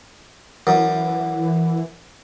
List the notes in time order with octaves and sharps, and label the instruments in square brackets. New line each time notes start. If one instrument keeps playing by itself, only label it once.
[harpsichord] F#2 [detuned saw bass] E3